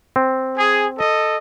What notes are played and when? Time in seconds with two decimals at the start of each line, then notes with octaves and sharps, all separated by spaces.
0.16 C4
0.57 G#4
0.98 A4 D#5